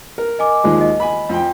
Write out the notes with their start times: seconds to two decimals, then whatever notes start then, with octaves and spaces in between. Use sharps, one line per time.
0.18 A#4
0.39 D#5 G#5 D6
0.64 D#2 F3 G#3
0.81 D#5
1.00 G#5 B5
1.29 F2 G5